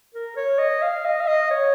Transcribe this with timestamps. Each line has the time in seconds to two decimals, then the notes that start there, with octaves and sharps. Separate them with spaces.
0.14 A#4
0.37 C#5
0.59 D#5
0.83 F5
1.05 D#5
1.21 F5
1.28 D#5
1.51 C#5